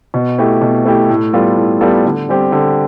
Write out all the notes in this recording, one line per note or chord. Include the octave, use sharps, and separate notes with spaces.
B2
A3 E4 G4
B2
A3 E4 G4
A2
G3 B3 F4 A4
A2
G3 B3 F4 A4
D3
G3 C4 G4
D3